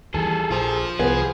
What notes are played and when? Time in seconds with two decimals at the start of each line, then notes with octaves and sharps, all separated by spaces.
0.14 D#2 E3 G3 G#4 A4
0.51 A#1 F4 C5
0.99 C2 B3 G#4